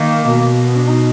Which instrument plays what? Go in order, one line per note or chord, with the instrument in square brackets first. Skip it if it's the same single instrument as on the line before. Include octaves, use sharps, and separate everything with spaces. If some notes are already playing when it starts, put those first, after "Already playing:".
Already playing: [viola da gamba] D#3 [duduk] A#3
[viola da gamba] B2
[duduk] B3
D4
D#4